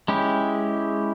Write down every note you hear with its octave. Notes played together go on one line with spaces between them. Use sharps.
G#3 C#4 E4 G4